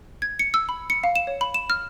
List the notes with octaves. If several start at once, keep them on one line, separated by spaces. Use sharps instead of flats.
G#6
C#7
E6
B5
C#7
F5
E7
C#5
B5
E7
F6